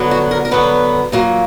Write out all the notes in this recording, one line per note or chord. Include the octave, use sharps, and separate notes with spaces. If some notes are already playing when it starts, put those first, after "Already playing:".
Already playing: D3 F#3 B3
F#4
A#4
A#4
D3 F#3 B3 B4
A#2 F#3 A#3